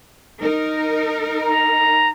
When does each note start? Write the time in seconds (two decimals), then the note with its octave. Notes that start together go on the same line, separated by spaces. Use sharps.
0.41 D#4 A#4
1.42 A#5